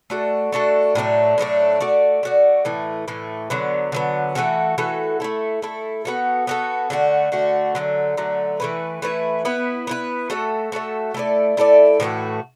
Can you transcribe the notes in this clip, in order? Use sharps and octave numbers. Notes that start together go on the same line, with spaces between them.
A3 D4 F#4 A4
A3 D4 F#4 A4
A2 F#3 A3 D4
A2 F#3 A3 D4
A3 F#4 D5
A3 F#4 D5
A2 E3 A3
A2 E3 A3
D3 F#3 B3
D3 F#3 B3
E3 A3 F#4 A4
E3 A3 F#4 A4
A3 E4 A4
A3 E4 A4
B3 F#4 A4
B3 F#4 A4
D3 A3 F#4
D3 A3 F#4
D3 F#3 A3
D3 F#3 A3
E3 A3 E4 B4
E3 A3 E4 B4
B3 E4 B4
B3 E4 B4
A3 F#4 A4 E5
A3 F#4 A4 E5
A3 E4 A4 D5
A3 E4 A4 D5
A2 E3 A3 F#4